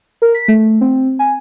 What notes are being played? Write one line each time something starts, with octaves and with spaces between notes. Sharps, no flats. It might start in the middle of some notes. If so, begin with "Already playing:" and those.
A#4
B6
A3
C4
G#5